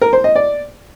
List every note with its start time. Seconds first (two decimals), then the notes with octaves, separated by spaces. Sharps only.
0.01 A#4
0.13 C5
0.24 D#5
0.35 D5